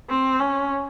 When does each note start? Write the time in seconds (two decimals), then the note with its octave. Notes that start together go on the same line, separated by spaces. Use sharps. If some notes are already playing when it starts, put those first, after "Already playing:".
0.10 C4
0.40 C#4